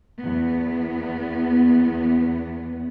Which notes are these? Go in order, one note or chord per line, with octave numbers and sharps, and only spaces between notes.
E2 B3